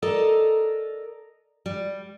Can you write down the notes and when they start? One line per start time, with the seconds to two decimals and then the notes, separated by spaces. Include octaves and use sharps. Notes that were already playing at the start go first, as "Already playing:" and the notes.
0.02 A4 A#4 D5 D#5
1.66 G3